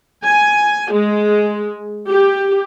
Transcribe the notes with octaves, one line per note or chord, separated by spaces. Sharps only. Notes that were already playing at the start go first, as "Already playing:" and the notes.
G#5
G#3
G4